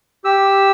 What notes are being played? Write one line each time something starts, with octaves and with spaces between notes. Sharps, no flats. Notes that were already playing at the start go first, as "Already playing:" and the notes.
G4 E6